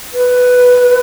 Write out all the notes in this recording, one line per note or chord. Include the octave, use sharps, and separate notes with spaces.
B4